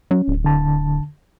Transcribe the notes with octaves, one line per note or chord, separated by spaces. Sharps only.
F#3 C#4
D1
D3 A5